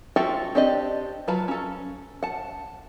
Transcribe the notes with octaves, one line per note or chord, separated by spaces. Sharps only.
F4 F#4 A4 E5 G5
C4 D4 G4 D5 D#5
F#3 F4 B4 A5 B5
C#4 A4
F#5 A5